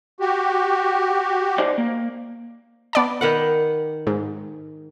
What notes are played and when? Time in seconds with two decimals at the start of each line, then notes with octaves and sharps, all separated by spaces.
0.20 F#4 G4
1.58 D#4 C5 D5
1.78 A#3
2.93 B3 D5 A5
3.21 D#3 B4 F#5
4.07 G#2